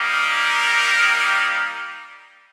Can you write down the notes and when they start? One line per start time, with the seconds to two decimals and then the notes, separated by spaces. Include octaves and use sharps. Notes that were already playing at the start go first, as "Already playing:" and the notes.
Already playing: G3 A#3 D#4 G4
0.10 A#4